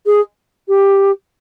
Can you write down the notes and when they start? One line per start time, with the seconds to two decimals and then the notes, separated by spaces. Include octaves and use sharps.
0.06 G#4
0.68 G4